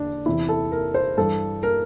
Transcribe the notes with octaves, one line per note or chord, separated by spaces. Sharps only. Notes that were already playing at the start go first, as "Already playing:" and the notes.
Already playing: E2 D3 D4
E2 C3 E3 E4
A4
A#4
C5
G2 E3 A4
A#4